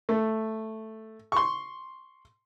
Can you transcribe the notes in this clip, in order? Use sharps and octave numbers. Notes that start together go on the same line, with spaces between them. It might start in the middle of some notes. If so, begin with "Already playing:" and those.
A3
C6 C#6